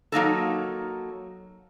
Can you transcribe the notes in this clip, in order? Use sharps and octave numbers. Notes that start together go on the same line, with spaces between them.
F#3 A#3 D#4 A4